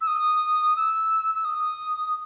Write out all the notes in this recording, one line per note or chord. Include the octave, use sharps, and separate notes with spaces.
E6
D#6
E6
E6
D#6